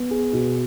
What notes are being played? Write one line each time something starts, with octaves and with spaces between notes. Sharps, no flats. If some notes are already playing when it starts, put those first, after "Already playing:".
Already playing: B3
G#4
B2